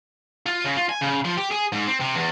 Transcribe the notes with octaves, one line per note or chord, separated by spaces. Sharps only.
F4
C#3
F4
G#5
C#3
F3
G4
G#4
G#2
C4
C3
E2